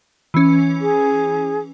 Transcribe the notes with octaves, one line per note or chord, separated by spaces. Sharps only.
E3 C#4
G#4